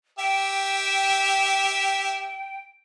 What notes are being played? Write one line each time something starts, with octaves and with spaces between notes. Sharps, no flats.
G4 E5 G5